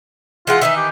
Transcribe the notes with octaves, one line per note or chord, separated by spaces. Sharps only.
E3 G#3 F4 F#5
D#3 E3 D#4 E5
G4